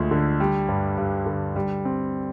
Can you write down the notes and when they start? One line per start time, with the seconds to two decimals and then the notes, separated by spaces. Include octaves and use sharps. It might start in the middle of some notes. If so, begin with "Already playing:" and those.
Already playing: D2 F3 G#3
0.11 D3
0.40 G3
0.69 G2
0.98 G2
1.26 D3
1.56 G3
1.85 C4